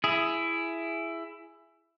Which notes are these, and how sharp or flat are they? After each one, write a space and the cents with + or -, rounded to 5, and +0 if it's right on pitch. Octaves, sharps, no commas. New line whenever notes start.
E4 +15 G#4 +5